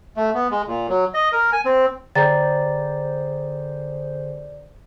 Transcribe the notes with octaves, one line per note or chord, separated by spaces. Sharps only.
A3
B3
G#3
A#2
F#3
D#5
A#4
G#5
C4
D3 G#4 C5 D5 G5 A#5 A6